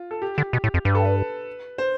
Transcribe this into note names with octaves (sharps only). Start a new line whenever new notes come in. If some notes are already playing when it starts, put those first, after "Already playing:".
Already playing: F4
A4
G4
D3
B2
A2
F2
G2 B4
A4
B4
C5